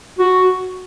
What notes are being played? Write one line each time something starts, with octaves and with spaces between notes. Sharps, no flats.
F#4